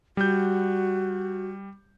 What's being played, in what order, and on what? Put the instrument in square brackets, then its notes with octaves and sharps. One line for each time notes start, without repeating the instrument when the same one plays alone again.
[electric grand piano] G3 G6 [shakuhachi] F#4